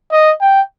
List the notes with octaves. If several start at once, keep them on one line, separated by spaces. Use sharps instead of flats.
D#5
G5